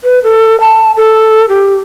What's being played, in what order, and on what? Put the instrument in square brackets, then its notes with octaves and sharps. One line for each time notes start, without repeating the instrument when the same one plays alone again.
[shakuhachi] B4
A4
A5
A4
G4